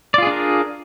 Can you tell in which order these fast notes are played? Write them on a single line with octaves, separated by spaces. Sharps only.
D5 F4 G#4 D4 A#4